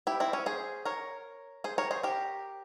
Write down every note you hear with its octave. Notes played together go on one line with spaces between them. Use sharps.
E4 G4
C4 E4
C#4
G#4 C5
A#4 C#5
G#4 C5
A#4 C#5
G#4 C5
G4 A#4